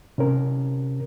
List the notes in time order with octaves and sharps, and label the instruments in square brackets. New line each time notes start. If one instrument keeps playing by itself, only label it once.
[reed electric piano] C3 C#4 A#4